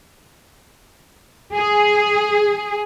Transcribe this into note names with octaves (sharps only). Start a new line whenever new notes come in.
G#4